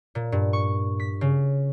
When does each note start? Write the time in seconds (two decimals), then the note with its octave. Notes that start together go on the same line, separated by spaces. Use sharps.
0.15 A#2
0.32 G2
0.53 C#6
1.00 B6
1.21 C#3